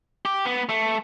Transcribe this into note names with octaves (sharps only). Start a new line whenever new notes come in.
G4
B3
A3